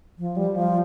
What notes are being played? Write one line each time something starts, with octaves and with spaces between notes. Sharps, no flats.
F3
G3
F3